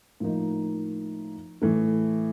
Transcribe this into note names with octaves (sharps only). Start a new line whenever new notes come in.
A2 F3 A#3 D#4
A2 E3 A3